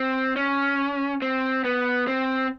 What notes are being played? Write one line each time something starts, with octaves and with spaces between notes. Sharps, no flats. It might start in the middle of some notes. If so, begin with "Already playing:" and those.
Already playing: C4
C#4
C4
B3
C4